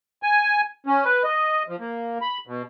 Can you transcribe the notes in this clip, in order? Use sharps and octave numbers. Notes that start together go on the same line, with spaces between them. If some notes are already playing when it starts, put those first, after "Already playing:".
G#5
C#4
B4
D#5
F3
A#3
B5
B2